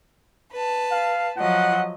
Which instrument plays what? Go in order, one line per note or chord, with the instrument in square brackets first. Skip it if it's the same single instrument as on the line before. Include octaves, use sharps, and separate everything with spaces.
[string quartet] B4 A5
[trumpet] F5
[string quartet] F3 F#3 D#5 [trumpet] F#5